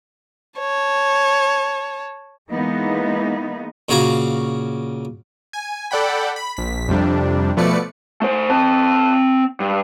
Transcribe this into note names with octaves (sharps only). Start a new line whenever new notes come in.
C#5 A5
E3 G#3 A#3 B3 D#4
A#2 C#3 F#4 C#5 F5 A#5
G#5
A4 D5 F#5 G5 B5
B5
A#1 B6
F2 C3 G3 D4
B2 F3 A3 B4 D5 C#7
A3 C5
C4 A5
G2